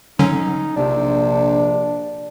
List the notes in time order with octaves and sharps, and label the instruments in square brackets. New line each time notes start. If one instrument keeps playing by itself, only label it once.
[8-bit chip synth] D3 F#3 C#4 [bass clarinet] D#4
[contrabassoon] A#1 [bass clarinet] C3 [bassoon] D4